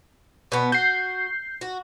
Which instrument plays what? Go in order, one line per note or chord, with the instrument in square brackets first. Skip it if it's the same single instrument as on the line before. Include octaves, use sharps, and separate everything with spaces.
[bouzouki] B2 B3
[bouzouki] F#4 [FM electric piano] G6 C7
[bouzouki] F#4